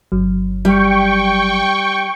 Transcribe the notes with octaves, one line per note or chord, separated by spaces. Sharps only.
G1 F#3
G3 G5 C#6